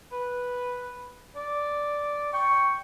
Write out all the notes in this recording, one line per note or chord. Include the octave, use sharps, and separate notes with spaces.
B4
D5
G5 C#6